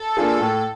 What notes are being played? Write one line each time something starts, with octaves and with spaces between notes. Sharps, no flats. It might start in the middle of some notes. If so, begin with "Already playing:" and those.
Already playing: A4
A#3 D4 F4 G#4
A2